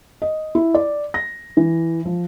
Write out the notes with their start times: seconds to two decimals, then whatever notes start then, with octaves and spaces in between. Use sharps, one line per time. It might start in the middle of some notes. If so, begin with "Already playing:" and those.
0.22 D#5
0.55 E4
0.75 D5
1.14 A#6
1.57 E3
2.05 F3